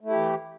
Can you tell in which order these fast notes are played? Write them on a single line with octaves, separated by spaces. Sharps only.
A3 E4 G4 E3